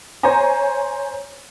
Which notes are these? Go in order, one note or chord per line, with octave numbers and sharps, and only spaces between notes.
C5 C#5 G#5 A#5